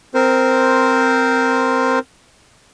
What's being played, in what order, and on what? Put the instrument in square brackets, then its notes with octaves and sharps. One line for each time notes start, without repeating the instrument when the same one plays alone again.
[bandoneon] C4 A#4 C5